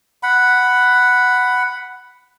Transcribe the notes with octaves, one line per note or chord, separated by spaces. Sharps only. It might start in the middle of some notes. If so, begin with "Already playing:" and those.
F#5 B5